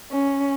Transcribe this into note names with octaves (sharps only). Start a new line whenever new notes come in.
C#4